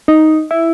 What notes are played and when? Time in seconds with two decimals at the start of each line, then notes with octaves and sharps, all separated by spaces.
0.08 D#4
0.51 E4